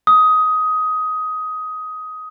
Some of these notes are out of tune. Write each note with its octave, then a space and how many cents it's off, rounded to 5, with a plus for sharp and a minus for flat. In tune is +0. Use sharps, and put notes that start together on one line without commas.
D#6 +15